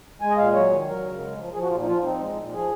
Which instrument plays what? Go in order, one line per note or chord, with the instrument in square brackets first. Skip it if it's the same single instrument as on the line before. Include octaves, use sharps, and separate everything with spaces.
[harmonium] G#3 G#5
D#5
A#2 F5
F#3 C#5
D#3
F#3 A#4
C#3
G#3
F3
F3 G#4
F#4
A#2 F4
D#4
F3 F4
C4 D#4
G#3
A#2
F3 G#4